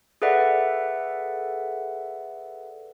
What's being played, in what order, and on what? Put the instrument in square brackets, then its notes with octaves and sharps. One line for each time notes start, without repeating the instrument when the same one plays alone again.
[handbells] G#4 A4 B4 D5 E5 F#5